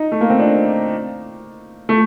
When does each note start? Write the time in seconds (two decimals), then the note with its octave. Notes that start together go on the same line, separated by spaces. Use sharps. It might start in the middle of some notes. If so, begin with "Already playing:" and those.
Already playing: D#4
0.12 A3
0.21 A#3
0.30 C4
0.39 D4
1.89 A3